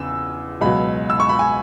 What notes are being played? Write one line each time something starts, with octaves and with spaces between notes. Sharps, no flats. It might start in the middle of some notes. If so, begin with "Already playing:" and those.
Already playing: E2 C#3 E6
C#2 B2 F#3 B5
E6
C#6
B5
G#5